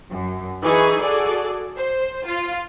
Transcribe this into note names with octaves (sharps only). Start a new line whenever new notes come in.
F#2
E3 D#4 G#4 C#6
F#4 G#4 A4 D5
C5
F4